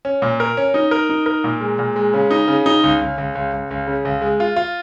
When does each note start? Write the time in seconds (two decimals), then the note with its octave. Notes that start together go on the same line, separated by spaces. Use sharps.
0.05 C#4
0.22 A#2
0.40 A#4
0.57 C#4
0.74 D#4
0.91 A#4
1.10 D#4
1.26 A#4
1.44 A#2
1.61 G#3
1.79 A#2
1.96 G#3
2.13 C#3
2.31 D#4
2.48 C#3
2.66 D#4
2.84 C#2
3.01 C#2
3.18 C#2
3.35 C#2
3.53 C#2
3.71 C#2
3.87 C#3
4.05 C#2
4.22 G#3
4.40 F4
4.56 F4